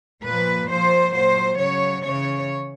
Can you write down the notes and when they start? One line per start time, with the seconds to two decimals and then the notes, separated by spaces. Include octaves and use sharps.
0.24 A#2 F3 B4
0.69 A#2 F3 C5
1.14 A#2 F#3 C5
1.59 C#3 F#3 C#5
2.04 C#3 E3 C#5